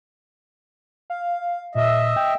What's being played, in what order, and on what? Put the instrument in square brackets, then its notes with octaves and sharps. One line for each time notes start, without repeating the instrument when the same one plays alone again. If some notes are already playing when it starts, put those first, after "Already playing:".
[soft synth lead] F5
[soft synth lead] A#2 [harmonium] D#5 E5
[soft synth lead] G5